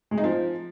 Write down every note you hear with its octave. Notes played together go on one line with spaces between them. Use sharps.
G#3
D#4
F3